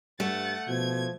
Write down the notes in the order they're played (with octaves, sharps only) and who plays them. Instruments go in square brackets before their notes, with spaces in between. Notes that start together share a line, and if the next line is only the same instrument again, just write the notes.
[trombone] G2 [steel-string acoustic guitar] A3 [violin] F#5 A6
[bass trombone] B2 [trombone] F3 [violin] G#6